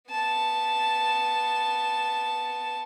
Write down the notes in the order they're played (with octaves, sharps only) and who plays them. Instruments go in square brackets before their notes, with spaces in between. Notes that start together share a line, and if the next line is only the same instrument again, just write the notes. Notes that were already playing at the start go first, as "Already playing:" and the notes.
[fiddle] B3 A5